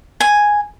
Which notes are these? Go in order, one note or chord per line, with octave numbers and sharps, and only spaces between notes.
G#5